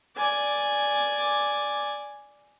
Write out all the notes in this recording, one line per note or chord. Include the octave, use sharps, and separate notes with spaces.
D5 G#5